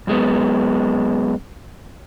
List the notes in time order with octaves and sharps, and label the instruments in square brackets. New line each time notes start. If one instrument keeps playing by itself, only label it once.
[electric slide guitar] F#2 G#3 B3